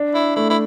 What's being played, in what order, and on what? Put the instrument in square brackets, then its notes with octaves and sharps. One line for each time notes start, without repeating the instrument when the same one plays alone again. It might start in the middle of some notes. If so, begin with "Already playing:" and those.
Already playing: [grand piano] D4
[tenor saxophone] E4
[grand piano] A3 [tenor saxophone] E4
[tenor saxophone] E4